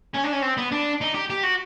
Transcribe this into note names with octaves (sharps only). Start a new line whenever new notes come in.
C#4
D4
C#4
C4
B3
D4
D#4
G4
G4
F#4